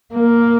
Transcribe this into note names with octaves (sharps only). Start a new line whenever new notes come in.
A#3